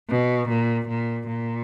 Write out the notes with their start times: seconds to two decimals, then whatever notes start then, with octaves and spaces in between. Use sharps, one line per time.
0.10 B2
0.49 A#2
0.88 A#2
1.27 A#2